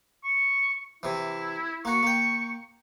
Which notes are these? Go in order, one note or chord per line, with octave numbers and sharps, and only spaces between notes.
C#6
C3 E3 E4
A#3 F#4 C#6
A#3 G5